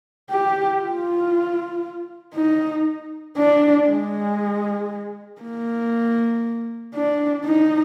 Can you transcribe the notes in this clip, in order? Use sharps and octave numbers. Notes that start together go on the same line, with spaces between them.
G4
F4
D#4
D4
G#3
A#3
D4
D#4